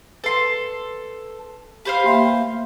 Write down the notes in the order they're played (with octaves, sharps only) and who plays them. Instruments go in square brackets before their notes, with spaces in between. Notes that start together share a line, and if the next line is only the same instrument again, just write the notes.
[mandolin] A4 C6 [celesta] B4
[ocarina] G4 [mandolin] B4 C5 F5
[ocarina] A#3 [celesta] E5 G5 C6